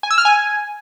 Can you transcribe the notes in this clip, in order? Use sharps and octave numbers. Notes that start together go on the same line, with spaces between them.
G#5
E6
F6
G#5